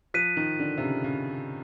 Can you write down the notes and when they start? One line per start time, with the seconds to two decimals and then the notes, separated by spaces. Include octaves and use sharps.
0.14 F3 F#6 B6 D#7
0.37 D#3
0.59 D3
0.78 C3
0.82 C#3
1.04 C#3